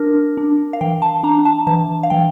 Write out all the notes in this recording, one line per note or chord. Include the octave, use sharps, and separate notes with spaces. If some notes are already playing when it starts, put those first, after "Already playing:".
Already playing: D4 A#4
D4
F5
E3 G5
A5
D4 A#5
A5
E3 A5
F5
E3 G5